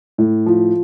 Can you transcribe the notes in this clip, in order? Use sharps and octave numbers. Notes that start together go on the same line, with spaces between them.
A2
F3